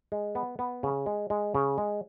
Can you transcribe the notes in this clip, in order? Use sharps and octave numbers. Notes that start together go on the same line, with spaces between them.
G#3
B3
B3
C#3
G#3
G#3
C#3
G#3